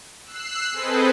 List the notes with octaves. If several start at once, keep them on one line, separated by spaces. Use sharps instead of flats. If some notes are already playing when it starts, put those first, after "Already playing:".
E6 F#6 C7
C4 G#4 A4 B4 C5 D#5